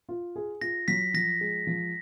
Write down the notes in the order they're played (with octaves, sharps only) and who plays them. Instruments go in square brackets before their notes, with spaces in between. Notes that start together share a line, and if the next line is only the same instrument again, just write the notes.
[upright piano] F4
G#4
[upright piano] F4 [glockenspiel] A#6
[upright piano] F#3 [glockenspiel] B6
[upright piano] F3 [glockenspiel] A#6
[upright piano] G#3
F3